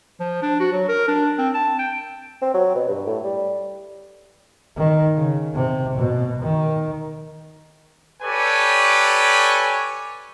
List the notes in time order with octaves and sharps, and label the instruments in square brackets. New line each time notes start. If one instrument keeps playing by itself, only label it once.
[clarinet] F3
D4
F#4
F#3
A#4
D4
C4
A5
G5
[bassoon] C4
F#3
B2
G2
A2
G3
[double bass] D#3
C#3
C3
B2
D#3
[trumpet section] G4 A4 B4 C#5 D5 G#5